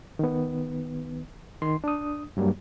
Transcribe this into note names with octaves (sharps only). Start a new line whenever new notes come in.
D#3 B3
D#3 C6
D4 D#6
G2 F#3 G3 A#3